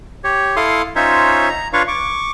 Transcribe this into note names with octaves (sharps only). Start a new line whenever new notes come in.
G4 C#5
E4 A4 F5 C6 D#6
C#4 D#4 F4 C5 C#5 E5
A#5
D4 F4 B4 C#5 F5 C#6
C#6 D6